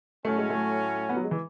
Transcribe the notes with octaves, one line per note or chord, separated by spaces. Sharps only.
A2 F#3 A3 C#4
G#3
A3
B3
F#3
G#3
E3